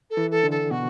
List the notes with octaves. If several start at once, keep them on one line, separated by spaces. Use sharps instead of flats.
A4
E3
A4
D3
A4
B2 F#4